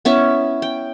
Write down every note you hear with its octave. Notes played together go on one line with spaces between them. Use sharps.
B3 C#4 E4 E5
G5